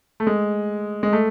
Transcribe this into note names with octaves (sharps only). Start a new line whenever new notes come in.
A3
G#3
G#3
A3